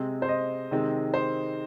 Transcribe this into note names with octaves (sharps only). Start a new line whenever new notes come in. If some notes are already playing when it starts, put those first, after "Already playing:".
Already playing: C3 G#3 C4
C5
D#5
C3 D#3 G#3 C4
C5